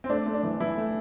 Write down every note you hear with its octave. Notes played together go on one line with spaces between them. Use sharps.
C4
A3 D4
A3
D4
E3
E3 E4
A3